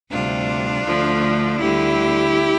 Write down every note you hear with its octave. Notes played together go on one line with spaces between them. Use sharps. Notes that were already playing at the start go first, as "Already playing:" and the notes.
D2 C3 G3 D4 F4
D2 D3 F3 A3
D2 D3 G3 E4 G4